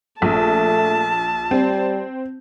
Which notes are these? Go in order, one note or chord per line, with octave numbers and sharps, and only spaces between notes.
A#1 A3 A5
G3 C4